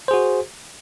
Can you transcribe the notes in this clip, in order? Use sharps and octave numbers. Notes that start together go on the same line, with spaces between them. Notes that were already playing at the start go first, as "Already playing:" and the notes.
F#4 G#4 C5